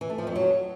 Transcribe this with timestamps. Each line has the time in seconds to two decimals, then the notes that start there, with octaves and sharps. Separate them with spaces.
0.01 E3
0.10 A3
0.18 F3
0.27 F2
0.36 F#3